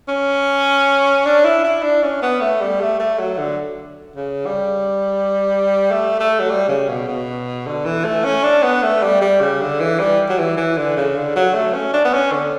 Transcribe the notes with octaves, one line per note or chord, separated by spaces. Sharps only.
C#4
D4
E4
E4
D4
C#4
B3
A3
G3
A3
A3
F#3
D3
C#3
G3
A3
A3
F#3
G3
C#3
B2
B2
D3
E3
A3
C#4
D4
B3
A3
G3
G3
C#3
D3
E3
G3
F#3
E3
E3
D3
C#3
D3
F#3
A3
C#4
D4
B3
C#4
D3